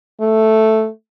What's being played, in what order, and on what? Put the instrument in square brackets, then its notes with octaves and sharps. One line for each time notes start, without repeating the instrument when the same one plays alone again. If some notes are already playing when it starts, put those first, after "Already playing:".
[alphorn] A3